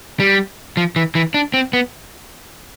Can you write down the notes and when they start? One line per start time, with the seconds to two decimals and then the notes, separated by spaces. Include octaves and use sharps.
0.20 G3
0.77 F3
0.96 E3
1.15 E3
1.34 D4
1.54 C4
1.73 B3